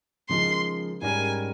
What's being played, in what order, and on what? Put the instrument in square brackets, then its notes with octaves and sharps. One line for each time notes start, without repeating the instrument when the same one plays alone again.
[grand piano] C#3 F3 G#3 D#4 A#4 [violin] C6
[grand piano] G#2 G3 C#4 G4 A#4 [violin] G#5